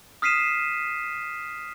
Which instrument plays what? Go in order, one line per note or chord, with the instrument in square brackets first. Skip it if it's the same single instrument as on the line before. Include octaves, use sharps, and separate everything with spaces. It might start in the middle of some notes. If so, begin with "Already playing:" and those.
[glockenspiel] D#6 F6 B6 C7 D#7 E7